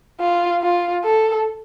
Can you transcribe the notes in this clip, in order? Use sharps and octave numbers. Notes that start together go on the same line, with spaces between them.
F4
F4
A4